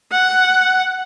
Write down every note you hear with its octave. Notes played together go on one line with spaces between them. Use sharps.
F#5